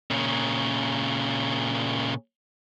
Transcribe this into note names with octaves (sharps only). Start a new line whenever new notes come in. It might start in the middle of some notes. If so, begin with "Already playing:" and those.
A#2 C#3